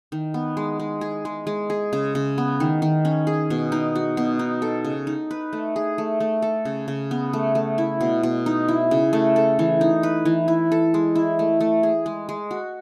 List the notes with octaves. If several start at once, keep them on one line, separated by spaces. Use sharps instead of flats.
D#3
B3
G#3
G#3
G#4
G#3
G#3
G#4
C#3
C#3
B3
D#3
D#3
C#4
G#4
B2
D#4
F#4
B2
D#4
A4
C#3
D#4
B4
A3
G#4
A3
A3
A4
C#3
C#3
B3
A3
A3
E4
B2
B2
D#4
E4
C#3
A3
A4
E3
D#4
B4
E3
E4
A4
G#3
E4
A3
A3
G#4
G#3
G#3
F#4